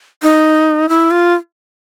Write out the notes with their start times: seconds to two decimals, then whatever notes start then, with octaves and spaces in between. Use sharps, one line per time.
0.23 D#4
0.89 E4
1.11 F4